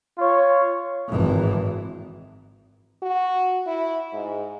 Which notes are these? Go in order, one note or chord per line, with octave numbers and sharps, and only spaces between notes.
F4 C#5
G#1 E3
F#4
E4
G#2